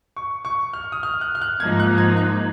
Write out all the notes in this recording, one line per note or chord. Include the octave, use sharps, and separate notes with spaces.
C#6
C#6
F6
D#6
F6
F#6
F6
F#6
G#2 F3 A#3 D#4 G#6
F#6
G#6
F#6